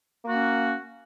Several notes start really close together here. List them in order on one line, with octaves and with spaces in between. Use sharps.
A#3 F#4 C#4